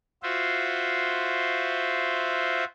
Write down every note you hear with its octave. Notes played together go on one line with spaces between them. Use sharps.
F4 F#4 C5 E5